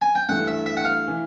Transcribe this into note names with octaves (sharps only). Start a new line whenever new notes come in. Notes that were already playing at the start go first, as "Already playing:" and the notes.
G#5
G5
G2 E3 A3 D4 F#5
E5
E5
F#5
F5
E3